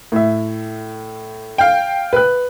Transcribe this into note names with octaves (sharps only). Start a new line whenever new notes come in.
A2 E5
F5 G5
B4 F#6